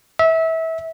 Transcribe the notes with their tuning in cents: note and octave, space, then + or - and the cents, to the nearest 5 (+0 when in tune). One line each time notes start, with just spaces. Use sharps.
E5 -25